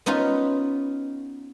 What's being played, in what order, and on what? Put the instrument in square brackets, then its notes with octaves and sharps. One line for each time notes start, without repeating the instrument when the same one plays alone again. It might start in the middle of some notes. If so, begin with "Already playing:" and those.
[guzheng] B3 C#4 D#4 F4 B4